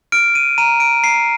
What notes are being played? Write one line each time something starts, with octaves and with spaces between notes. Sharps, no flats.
F6 D7
D#7
A#5 D#7
D7
A#5 C7